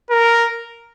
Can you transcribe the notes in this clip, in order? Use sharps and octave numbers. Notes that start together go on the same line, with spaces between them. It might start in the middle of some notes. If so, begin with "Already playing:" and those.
A#4